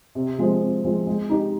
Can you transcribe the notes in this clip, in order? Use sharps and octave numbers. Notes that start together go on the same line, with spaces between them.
C3
F3 G#3 C4
C3
F3 G#3 C4
G#3
D#4 G4